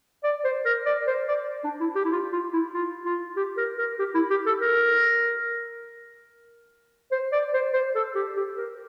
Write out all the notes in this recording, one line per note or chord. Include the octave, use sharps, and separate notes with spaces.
D5
C5
A#4
D5
C5
D5
D4
E4
G4
E4
F4
F4
E4
F4
F4
G4
A#4
A#4
G4
E4
G4
A4
A#4
C5
D5
C5
C5
A4
G4
G4
A#4